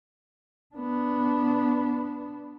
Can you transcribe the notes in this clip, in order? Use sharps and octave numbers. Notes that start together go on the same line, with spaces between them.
B3 D4